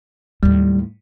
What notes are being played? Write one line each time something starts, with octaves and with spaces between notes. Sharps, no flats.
D#2 A2 G3